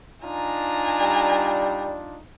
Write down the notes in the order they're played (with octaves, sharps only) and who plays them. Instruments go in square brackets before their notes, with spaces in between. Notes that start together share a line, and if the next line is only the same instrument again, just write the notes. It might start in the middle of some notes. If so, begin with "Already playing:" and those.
[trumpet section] D4 D#4 F4 [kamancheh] G#5 A#5
[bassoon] G3